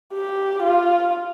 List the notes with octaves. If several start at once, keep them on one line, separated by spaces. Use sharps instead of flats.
G4
F4